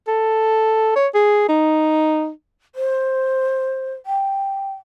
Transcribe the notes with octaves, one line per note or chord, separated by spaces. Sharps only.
A4
C#5
G#4
D#4
C5
G5